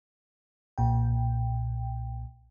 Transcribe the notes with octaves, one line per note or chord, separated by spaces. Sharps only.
B1 A#2 G5